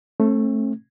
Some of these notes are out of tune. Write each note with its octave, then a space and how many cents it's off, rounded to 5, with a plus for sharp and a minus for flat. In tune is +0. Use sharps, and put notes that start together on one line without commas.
A3 +0 C4 +45